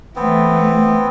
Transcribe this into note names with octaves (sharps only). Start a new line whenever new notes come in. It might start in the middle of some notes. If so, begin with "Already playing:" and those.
E3 A3 B3 C4